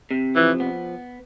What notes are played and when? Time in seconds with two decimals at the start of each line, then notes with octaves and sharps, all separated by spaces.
0.11 C3
0.36 E3 F3
0.60 B3